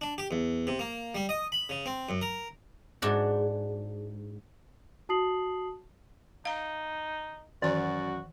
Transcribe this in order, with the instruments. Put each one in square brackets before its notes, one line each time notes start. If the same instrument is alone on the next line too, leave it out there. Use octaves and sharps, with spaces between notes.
[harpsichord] D4
G4
E2
C3
A#3
G3
D#5
B5
C#3
C4
F#2
A#4
[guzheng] G#2 D4 F#4
[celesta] F#4 A5 D#6 C7 F#7
[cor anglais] D#4 [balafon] F5 A#5
[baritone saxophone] F#2 [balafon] D#3 E3 C#6 [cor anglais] F#4 [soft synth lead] D5